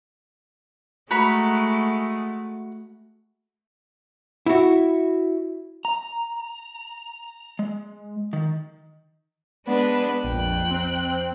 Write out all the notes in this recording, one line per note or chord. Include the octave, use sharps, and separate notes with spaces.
G#3 A3 F#4 A#5 B5
E4 F#4
A#5
G#3
D#3
G#3 B3 D4 B4
A#1 F2 G5 F#6
C4